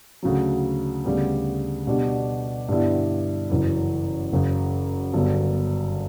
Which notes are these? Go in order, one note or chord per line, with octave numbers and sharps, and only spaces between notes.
D2 C#3 F#3
D2 C#3 G3 B3
B2 G3 D4 G4
G2 D3 G3 B3 E4
F#1 F#2 E3
F#1 F#2 C#3
G1 G2 F#3 B3